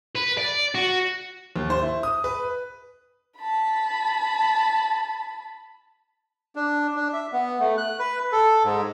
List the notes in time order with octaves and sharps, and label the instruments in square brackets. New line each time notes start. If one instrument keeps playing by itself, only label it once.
[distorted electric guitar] B4
D5
F#4
[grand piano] D#2
C5
E4
D#6
B4
[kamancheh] A5 B5
[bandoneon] D4
D4
E5
B3
A3
F#6
B4
A4
G#2